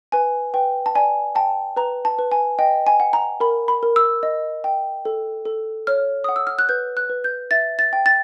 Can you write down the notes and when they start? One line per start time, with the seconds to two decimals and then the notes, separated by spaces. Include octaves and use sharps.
0.12 B4 G#5
0.54 B4 G5
0.86 A5
0.95 D5 G#5
1.35 G5 A5
1.77 B4 A#5
2.05 A5
2.19 B4
2.32 G#5
2.59 D#5 G5
2.87 G#5
3.00 F#5
3.13 A#5
3.40 A#4 B5
3.68 B5
3.83 A#4
3.96 E6
4.23 D#5
4.64 G5
5.05 A4
5.45 A4
5.87 C#5 F6
6.24 F#5 D#6
6.36 E6
6.47 F6
6.59 F#6
6.69 B4 G6
6.97 F#6
7.10 B4
7.24 G6
7.51 E5 A6
7.79 A6
7.93 G5
8.06 A6